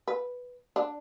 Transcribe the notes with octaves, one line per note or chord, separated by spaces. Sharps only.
B4
D4